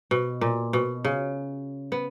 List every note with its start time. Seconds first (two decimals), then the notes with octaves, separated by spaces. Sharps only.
0.11 B2
0.41 A#2
0.73 B2
1.04 C#3
1.92 B3